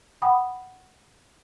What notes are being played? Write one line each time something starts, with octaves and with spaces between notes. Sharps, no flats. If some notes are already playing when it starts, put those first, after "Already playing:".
F#5 G5 B5 D6 D#6